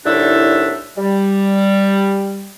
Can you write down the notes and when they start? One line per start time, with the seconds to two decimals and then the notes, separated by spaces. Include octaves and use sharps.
0.05 C2 A2 D3 D4 D#4 E5
0.97 G3